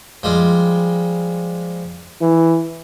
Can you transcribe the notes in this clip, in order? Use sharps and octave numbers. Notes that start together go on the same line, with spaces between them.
F3 G3 G#3
E3